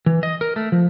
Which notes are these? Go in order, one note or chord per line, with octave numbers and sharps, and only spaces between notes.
E3
D#5
A#4
A3
F3